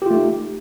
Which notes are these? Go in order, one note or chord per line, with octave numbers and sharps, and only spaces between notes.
A3 D#4 F4 G4